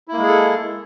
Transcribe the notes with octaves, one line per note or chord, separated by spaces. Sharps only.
G#3 A#3 E4 G#4 A4